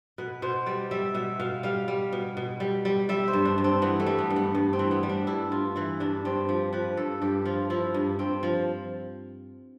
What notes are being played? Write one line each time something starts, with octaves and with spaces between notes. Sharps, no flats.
B2 B4
B2 C5
G3 D5
G3 E5
B2 E5
B2 F5
G3 F5
G3
B2
B2
G3
G3
G3 E5
C5
G2
D4
G2
C4
E3 B3
A3
G3
B3
G2
B3
G2
C4
E3
B3
G3
D4
G2 E4
G2 F4
E3 E4
G2 D4
G2 C4
F3 G4
F3 B4
G2 A4
G2 G4
F3 F4
F3 E4
G2
G2 C4
F3